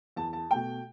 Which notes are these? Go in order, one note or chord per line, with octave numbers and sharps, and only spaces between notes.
E2 A5
A5
B2 A3 G5